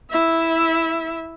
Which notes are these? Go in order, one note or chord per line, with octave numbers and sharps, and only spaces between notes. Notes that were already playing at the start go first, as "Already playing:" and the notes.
E4 E5